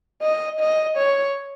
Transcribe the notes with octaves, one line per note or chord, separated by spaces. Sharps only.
D#5
D#5
C#5